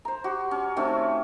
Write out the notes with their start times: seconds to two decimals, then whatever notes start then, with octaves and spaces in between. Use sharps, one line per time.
0.05 C5 A#5
0.24 F#4 G4
0.51 C#4
0.76 D#3 A3 C4 C#4